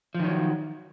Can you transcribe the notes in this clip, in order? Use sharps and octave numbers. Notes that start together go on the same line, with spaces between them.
D#3 F3 F#3